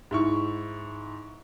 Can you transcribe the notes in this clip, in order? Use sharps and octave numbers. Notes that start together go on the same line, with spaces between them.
G#2 E4 C#6